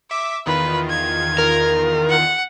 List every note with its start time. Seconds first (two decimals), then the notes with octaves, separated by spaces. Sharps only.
0.11 E5 D6
0.46 E2 D#3 F4 B4
0.90 G#6
1.38 A#4
2.10 F#5